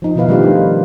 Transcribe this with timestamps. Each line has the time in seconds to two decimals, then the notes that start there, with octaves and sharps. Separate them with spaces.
0.02 F3 D#4
0.15 B2 D#3 F3 E4 B4 F5
0.28 D#3 G3 A3 D4 F4 G4
0.43 D#4